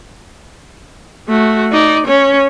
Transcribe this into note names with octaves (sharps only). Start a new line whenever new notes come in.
A3 F#4
D#4 D5
C#4 C#5